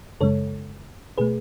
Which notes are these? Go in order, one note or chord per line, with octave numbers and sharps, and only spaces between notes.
F#2 C#3 G#3 A4 C#5
B2 A3 G#4 B4